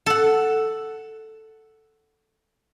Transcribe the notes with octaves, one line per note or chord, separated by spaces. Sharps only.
A4 F#5